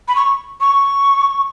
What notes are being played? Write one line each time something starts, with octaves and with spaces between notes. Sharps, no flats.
B5
C#6
C#6